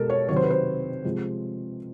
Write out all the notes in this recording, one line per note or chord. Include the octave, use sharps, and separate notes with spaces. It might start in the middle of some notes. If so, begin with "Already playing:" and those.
Already playing: B2 G#3 A4 A#4
C#5
C3 D#3 F#3 C#5
C5
B4
C5
C3 F3 G#3